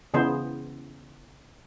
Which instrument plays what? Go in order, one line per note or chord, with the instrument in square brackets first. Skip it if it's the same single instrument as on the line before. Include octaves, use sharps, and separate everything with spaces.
[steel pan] C#3 E3 B3 G#4 C5